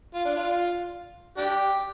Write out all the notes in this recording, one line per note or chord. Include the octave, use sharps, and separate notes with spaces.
F4
D4
F4
D4 G4